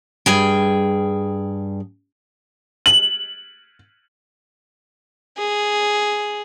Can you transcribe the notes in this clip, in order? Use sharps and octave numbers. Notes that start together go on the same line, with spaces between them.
G2 G#4 G5
F#7
G#4